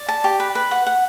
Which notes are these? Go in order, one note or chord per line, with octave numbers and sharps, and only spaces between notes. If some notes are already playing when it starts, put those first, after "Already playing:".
Already playing: D5
A5
G4
B4
B4
F#5
F#5